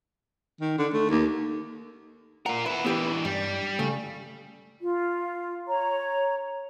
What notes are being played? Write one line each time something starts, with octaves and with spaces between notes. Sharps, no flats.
D#3
D3
A3
D#2
F4 A#4 F#5
B3 E4 B4
D3 E3 B3 G4 B4
G2 G3
C#3 A3
F4
C#5 A#5